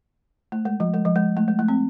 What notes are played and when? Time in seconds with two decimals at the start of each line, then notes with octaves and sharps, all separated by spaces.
0.52 A3
0.65 G#3
0.80 F3
0.94 G#3
1.05 F3
1.16 G#3
1.37 A3
1.48 G#3
1.59 A3
1.68 C4